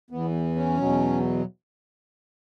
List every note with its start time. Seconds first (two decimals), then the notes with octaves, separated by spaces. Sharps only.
0.10 E2 E3 B3
0.55 C#4
0.78 E2 B2 F#3